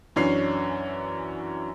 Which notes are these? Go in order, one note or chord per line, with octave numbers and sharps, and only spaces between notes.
F#2 E3 C#4 D4 C7